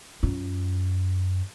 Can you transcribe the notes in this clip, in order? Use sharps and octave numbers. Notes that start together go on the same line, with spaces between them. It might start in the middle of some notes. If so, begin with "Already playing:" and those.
F#2 F4